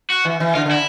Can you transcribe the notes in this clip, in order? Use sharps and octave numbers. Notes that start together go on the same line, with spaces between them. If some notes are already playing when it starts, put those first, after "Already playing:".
F#4
E3
E3
D3 F4
D3
E4